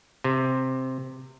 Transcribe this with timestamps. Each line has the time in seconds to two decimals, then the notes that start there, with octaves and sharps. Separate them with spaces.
0.24 C3